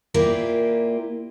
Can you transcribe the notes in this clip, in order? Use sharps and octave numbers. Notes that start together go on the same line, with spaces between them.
A#2 A#3 E4 F4 G4 D5